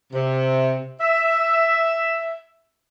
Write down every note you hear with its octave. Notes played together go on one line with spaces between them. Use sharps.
C3
E5